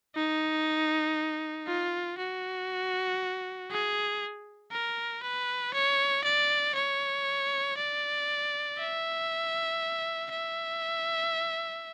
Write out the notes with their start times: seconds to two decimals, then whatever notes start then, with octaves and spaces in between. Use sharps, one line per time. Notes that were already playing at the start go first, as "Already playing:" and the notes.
0.15 D#4
1.67 F4
2.18 F#4
3.71 G#4
4.72 A#4
5.23 B4
5.73 C#5
6.24 D5
6.75 C#5
7.77 D5
8.78 E5
10.31 E5